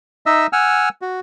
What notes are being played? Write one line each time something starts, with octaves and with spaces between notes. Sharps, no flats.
D#4 D#5 E5 E6
F#5 G#5 E6 F6
F#4